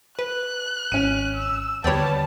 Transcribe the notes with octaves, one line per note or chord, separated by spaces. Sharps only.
B4 F#6
G#1 C#4 D#7
E6
D#2 D3 G3 B3 C#5 D5 G5 A5